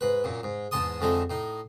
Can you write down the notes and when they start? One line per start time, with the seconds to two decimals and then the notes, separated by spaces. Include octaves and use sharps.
0.01 G#2 B4
0.24 F#2 A#2
0.43 G#2
0.71 E2 G#2 A5 C6 D#6
1.01 F2 D3 G#3 A3 D#4
1.30 A2 D#4